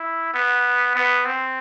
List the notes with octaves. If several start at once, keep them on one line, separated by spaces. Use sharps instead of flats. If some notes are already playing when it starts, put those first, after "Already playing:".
Already playing: E4
B3
B3
C4